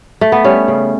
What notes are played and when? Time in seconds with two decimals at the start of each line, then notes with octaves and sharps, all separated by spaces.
0.21 A3
0.32 B3
0.44 G3 C#4
0.68 C#3